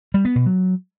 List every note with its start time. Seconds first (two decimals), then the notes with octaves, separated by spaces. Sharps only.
0.14 G3
0.25 B3
0.36 B2
0.46 F#3